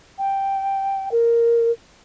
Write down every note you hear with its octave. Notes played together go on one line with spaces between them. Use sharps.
G5
A#4